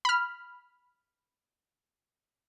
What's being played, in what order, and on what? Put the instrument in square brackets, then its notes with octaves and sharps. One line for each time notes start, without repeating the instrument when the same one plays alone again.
[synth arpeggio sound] B5 F6